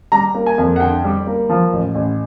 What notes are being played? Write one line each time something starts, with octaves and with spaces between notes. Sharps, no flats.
G3 A#5
A#3
G#5
F2
F#5
D3 G5
G3
A#3
F3
A1
A1